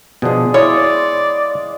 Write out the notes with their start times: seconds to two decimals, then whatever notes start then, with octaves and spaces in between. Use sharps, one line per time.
0.22 B2 F3 G#3 D4 G#4
0.54 E4 C#5 D5 F5 C6 D#6